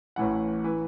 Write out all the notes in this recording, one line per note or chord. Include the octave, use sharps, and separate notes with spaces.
A1 A2 E3 F#5
E3